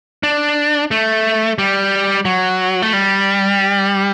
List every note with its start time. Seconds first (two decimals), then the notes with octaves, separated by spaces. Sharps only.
0.23 D4
0.91 A3
1.58 G3
2.25 F#3
2.82 A3
2.93 G3